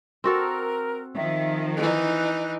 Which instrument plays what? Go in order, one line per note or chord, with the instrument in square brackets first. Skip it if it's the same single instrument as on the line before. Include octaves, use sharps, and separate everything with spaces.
[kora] C4 F#4 A4 [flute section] A#4
[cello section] D#3 F3 [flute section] E5
[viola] E3 D#4 [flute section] F#6